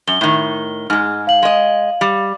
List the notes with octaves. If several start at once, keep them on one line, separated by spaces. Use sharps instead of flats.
F#2 G7
A2 D#3
G#2 G#3 F6
F5 F#7
G#3 D#5
G3